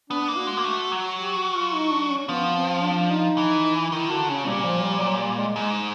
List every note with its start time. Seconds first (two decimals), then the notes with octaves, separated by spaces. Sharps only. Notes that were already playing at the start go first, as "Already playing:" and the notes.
0.10 B3 D4
0.28 A#3
0.37 F#4
0.47 G#3
0.57 A#3
0.65 A3
0.92 F#3
1.19 G4
1.37 F#4
1.56 F4
1.74 D#4
1.92 D4
2.10 C#4
2.28 F3 B3
2.55 C4
2.83 D4
3.10 D#4
3.38 E3
3.92 D#3 E4
4.10 D3 F#4
4.29 C#3 C#4
4.47 A#2 G3
4.65 F3
4.83 G3
5.01 F#3
5.19 G3
5.37 G#3
5.56 G#2 G#3